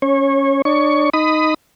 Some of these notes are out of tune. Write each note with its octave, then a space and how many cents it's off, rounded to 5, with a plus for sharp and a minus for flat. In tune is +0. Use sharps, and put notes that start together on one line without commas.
C#4 +0 C#5 -25
D4 +30 C#5 +15 C#6 +15
D#4 +0 B5 +25 D#6 +0